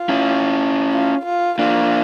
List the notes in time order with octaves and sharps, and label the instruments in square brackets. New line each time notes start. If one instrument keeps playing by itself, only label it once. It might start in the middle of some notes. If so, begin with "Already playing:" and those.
Already playing: [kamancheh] F4
[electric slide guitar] C#4 E4
[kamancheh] F4
F4
[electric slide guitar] A#3 D4 [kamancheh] F4